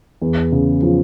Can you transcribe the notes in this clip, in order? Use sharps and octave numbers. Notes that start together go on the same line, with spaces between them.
E2
C#3
F3